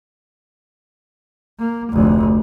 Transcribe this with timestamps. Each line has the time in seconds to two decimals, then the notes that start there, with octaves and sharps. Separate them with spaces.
1.59 A#3
1.92 F1 D2